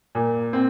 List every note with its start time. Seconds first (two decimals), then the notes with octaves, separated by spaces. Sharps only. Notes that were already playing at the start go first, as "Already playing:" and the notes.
0.15 A#2
0.53 C4